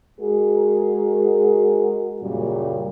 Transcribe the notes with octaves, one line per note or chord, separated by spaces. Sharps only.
G#3 F#4 G#4 A#4
F#2 A#2 C#3 G3